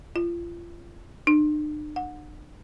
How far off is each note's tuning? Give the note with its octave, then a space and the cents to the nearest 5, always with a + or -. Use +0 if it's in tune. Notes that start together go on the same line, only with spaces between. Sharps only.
F4 -30
D4 +45
F#5 -25